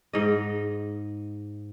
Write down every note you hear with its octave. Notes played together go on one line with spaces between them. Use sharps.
G#2 D#5